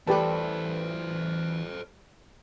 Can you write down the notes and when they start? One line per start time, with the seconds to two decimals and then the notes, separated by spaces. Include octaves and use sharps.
0.07 E3 G3 A3 G4 A4 B4 C5 A5